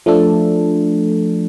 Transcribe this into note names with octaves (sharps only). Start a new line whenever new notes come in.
F3 A3 D4 A4